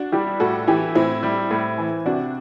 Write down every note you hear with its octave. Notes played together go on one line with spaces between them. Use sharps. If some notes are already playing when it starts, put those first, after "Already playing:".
Already playing: D4 F#4
G3 E4 G4
A2 F#4 A4
E3 E4 G4
A2 C4 E4
G3
A2
E3
C3 D4 F#4